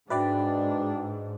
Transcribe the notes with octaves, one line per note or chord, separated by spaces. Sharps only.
G#2 D4 F#4 B4 D5 E5 G5